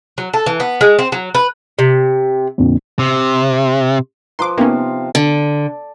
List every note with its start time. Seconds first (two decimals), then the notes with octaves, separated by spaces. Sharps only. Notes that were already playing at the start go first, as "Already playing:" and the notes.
0.18 F#3
0.34 A4
0.46 E3
0.60 B3
0.81 G#3
0.99 C4
1.12 F#3
1.35 B4
1.79 C3
2.58 F2 A#2 D3
2.99 C3
4.39 F3 F4 B4 A#5 C6 D6
4.58 C3 A#3 B3 C#4 D#4 B4 F5
5.15 D3